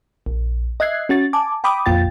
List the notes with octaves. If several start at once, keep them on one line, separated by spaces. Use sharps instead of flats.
A#1
D#5 E5 F#6 G#6 C7
C#4 F#4 A6
G#5 A5 D6
G5 B5 D6 D#6
A1 F2 A#2 F4 G5 A6